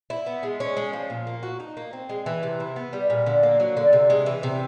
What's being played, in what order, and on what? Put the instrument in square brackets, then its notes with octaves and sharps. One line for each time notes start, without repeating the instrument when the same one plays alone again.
[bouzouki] E4
B3
G#3
C#4
G#3
F3
A#2
A#3
F#4
D#4
A#3
C4
G#3
E3
C3
E4
B3
G3
A#2
D3
A#3
F#3
D3
C3
G#3
E3
C3